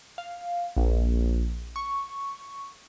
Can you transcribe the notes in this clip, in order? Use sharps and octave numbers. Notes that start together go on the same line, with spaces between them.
F5
A#1
C#6